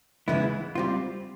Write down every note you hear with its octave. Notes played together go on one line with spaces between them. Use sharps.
C#3 E3 G#3 B3 E4
G3 C4 F4